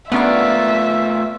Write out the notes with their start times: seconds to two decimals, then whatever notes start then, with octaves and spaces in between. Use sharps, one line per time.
0.12 A3 B3 C#4 D4 F4 A#4 E5 F5